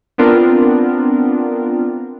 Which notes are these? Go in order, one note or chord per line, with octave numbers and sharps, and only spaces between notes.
B3 C4 D4 F4 A#4